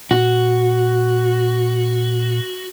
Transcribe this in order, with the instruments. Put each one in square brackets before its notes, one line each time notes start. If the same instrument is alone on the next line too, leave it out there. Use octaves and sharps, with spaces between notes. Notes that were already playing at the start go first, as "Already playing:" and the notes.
[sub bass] A#2 [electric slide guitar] F#4